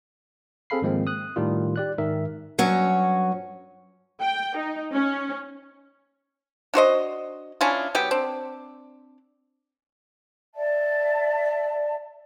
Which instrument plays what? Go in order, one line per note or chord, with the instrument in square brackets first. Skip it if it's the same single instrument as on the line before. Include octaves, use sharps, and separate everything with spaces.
[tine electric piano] C4 G#4 A4 F5 B5 C7
G#2 D#3 F3 G#3 A#3 C4
D#6 F#6
A2 D#3 G3 F4
G4 D5 F#6
G#2 D#3 A#4 E5
[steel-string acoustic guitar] G2 F#3 C#4 F#4 C#5
[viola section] G5
D#4
C#4
[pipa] D4 F#4 C5 D#5
C#4 D4 E4 F4
F#3 B3 G4
C4 D4
[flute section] D5 E5 A5